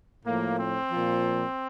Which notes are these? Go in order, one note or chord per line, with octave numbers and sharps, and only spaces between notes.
A2 F3 A#3
C4
A#2 F3